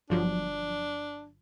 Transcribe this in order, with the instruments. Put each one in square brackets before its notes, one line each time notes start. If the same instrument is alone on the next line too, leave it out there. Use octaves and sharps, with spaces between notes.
[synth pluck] G1 F3 F#3 [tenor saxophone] D4